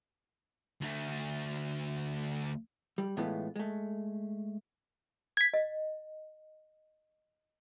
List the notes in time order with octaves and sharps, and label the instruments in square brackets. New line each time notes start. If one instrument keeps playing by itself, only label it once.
[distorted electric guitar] D2 A3
[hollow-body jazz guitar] G3
A2 E3 G#3 A3 B3 F4
G#3 A3
[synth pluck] G#6 B6
[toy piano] D#5